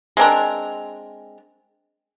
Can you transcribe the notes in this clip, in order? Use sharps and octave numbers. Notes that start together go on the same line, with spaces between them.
G#3 C4 D4 A#4